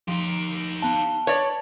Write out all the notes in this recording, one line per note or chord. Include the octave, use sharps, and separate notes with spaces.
F3 D#4 G4
B3 F5 A5 G7
B4 C#5 D5